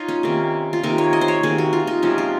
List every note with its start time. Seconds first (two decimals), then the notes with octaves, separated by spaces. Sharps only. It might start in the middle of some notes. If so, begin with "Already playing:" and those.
Already playing: D#4 F4 C#5 F5
0.08 C#4
0.23 C3 D#3 A#3
0.73 F4
0.83 C3 D#3 A#3 D#4
0.98 C#5
1.13 D#5
1.21 C5
1.28 C#5
1.43 C3 D#3 A#3 G#4
1.58 F#4
1.73 F4
1.87 D#4
2.03 C3 F3 G#3 C#4
2.18 F4